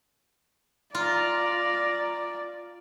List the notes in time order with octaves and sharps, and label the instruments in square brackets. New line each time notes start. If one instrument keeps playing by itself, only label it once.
[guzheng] F4 [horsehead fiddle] D5 [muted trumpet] A#5